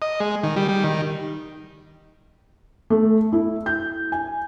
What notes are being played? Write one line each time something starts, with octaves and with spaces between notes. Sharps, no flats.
D#5
G#3
D#3
G3
G3
D#3
A3
E4
G6
G#5